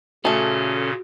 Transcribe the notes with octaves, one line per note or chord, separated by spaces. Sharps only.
A#2 C#3 A3 C#4 F#4 G#4 A4